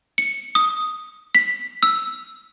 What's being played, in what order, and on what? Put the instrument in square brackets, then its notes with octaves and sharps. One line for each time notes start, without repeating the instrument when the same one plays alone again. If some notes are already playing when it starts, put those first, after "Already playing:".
[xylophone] C#7
D#6
B6
E6